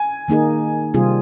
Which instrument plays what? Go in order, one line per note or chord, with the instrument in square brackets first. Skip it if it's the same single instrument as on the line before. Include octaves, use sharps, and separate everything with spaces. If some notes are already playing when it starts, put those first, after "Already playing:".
Already playing: [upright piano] G#5
[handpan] D#3 A#3 D#4 G#4
C3 G3 C4 F4 G#4